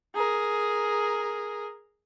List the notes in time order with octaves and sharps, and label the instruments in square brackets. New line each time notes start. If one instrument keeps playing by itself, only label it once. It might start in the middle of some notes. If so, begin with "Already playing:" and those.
[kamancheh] G#4 A#4